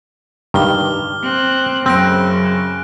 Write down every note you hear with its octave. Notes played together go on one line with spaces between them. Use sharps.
G2 D#3 D6 F6 G7
C4 F#6
F#2 C#3 C4 F#6 A#6 D7